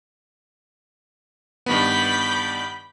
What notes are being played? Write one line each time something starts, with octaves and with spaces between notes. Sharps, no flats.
G2 D#3 B3 B5 D6 G6